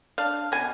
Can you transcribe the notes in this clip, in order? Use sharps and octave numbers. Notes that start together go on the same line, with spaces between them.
D4 F5
B2 G#5